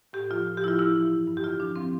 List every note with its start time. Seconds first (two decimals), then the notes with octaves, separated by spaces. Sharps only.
0.13 A2 G4
0.30 F3 F4
0.46 A2
0.57 G4
0.62 F3 E4
0.68 F4
0.78 E3 E4
0.95 E3
1.11 G2
1.28 G2
1.37 G4
1.44 D3 F4
1.59 F3 D4
1.76 F3 C4